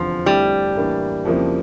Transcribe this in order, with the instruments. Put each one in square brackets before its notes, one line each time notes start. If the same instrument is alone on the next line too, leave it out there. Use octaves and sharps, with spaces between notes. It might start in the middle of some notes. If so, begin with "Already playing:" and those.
Already playing: [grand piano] F1 E2 D3 [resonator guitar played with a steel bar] F3
[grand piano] F2 D3 A3 E4 [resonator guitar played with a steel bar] G3
[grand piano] A2 E3 A#3 D4
F2 C#3 F3 A#3 E4